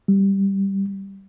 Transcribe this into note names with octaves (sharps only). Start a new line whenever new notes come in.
G3